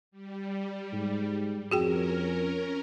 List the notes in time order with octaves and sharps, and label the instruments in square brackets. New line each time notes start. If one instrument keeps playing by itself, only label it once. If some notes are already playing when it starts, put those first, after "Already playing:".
[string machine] G3
[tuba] G#2
[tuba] F2 [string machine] C#4 A#4 [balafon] F#4 G#4 G5